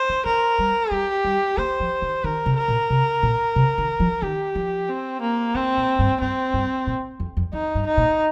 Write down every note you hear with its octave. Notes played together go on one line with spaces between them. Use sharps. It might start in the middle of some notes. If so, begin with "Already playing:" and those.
Already playing: C5
D#3
D#3 A#4
G3
G3 G4
G3
A#3 C5
F3
D#3
D#3 A#4
C3
A#4
A#2
C3
A#2
C3
D#3
F3
D#3 G4
F3
C4
A#3
D#3 C4
A#2
G2
G2 C4
G2
A#2
F2
F2
F2 D#4
G2
D#4
A#2